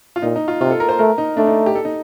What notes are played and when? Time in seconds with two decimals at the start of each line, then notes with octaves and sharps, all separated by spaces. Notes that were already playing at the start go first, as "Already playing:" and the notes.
0.16 F4
0.22 A#2 D#4
0.36 D#4
0.48 F4
0.60 C3 F4
0.71 A4
0.80 A#4
0.89 C5
0.99 A3 A#4
1.18 D#4
1.37 A3 D4
1.47 D#4
1.66 G4
1.75 A4
1.85 D#4